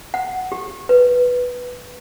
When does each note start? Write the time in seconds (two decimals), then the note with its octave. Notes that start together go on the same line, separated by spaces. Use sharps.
0.14 F#5
0.52 G4
0.89 B4